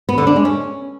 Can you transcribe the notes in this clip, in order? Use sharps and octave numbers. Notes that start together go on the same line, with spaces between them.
B3
D3
D4
G#3
C#4